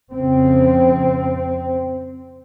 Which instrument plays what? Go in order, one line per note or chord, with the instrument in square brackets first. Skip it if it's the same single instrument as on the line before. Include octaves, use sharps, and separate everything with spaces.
[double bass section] F2 C#3 C4